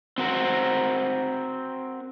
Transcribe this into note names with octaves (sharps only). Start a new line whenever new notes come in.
C4 F#4 A#4